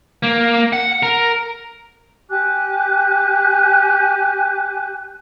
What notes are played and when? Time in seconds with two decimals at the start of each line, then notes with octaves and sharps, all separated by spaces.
0.23 A#3
0.73 F#5
1.03 A#4
2.30 G4 G#5 D6 F#6